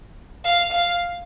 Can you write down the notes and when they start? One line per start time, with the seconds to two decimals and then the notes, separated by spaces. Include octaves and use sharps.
0.44 F5
0.72 F5